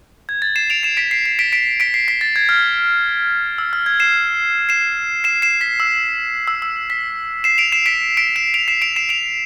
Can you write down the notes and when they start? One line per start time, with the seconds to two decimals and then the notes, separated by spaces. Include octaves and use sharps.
0.29 G#6
0.42 A6
0.56 C7 E7
0.70 D7 F7
0.83 C7 E7
0.97 B6 D7
1.11 C7
1.26 C7
1.39 B6 D7
1.52 B6 D7
1.80 B6 D7
1.94 C7
2.08 B6
2.21 A6
2.36 G#6
2.49 F6
3.58 E6
3.73 F6
3.86 G#6
4.00 C7 E7
4.69 C7 E7
5.24 C7 E7
5.42 C7 E7
5.61 B6
5.80 E6
6.47 E6
6.62 E6
6.90 B6
7.44 C7 E7
7.58 D7 F7
7.72 C7 E7
7.86 B6 D7
8.17 B6 D7
8.36 C7 E7
8.54 D7 F7
8.68 C7 E7
8.82 D7 F7
8.96 C7 E7
9.09 D7 F7